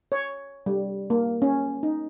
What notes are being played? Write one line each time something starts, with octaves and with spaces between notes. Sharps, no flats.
C#5
G3
A#3
C#4
D#4